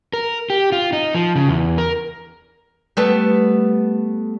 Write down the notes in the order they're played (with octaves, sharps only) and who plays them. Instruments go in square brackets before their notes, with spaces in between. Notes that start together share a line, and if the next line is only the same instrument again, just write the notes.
[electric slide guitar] A#4
G4
F4
D#4
F3
C#3
E2
A#4
[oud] G3 A3 B3